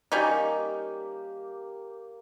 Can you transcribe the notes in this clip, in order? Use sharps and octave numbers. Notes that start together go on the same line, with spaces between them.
G3 A#3 C#4 D#4 G4